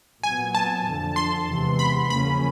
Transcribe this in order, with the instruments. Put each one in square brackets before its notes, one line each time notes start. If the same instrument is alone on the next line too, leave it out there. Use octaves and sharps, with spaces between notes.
[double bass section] A#2 F#3 B3 [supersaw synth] G#5
[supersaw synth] A5
[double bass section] F2 D3 F3
[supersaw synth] C6
[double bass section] E2 C3 E3 G#3 B3
[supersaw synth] B5
[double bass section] E2 C#3 F3 A#3 C#4 [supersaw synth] B5